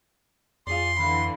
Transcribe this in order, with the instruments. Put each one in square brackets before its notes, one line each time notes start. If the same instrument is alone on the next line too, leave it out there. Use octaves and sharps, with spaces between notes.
[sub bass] F2 [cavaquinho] F4 G#4 D5 [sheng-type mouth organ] C6
[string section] D3 E3 [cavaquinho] F5 B5